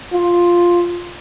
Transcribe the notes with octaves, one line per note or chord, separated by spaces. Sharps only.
F4